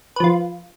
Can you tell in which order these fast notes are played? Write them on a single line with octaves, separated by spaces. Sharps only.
B4 F3 F4